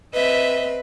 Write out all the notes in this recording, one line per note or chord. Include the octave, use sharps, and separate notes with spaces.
C4 B4 D#5 E5